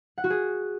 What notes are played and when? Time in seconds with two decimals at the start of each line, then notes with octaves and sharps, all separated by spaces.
0.18 F#5
0.24 F#4
0.30 G#4